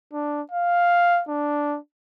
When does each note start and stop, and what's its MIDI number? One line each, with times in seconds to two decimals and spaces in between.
0.13 0.42 62
0.52 1.22 77
1.29 1.78 62